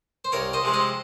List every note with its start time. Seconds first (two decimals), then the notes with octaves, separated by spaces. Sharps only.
0.25 C5
0.32 C2 A#4 C#5
0.53 C5 D#5
0.64 C3 F3 G#3
0.73 C5 D#5